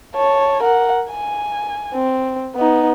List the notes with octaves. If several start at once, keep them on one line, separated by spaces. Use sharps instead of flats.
C#5 A5
A#4 F#5
G#5
C4
B3 D#4